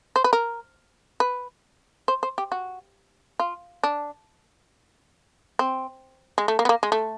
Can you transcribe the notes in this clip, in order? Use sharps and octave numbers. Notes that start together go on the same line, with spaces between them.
C5
B4
A#4
B4
C5
C5
G4
F#4
F4
D4
C4
G#3
A3
A#3
B3
A#3
G#3
A3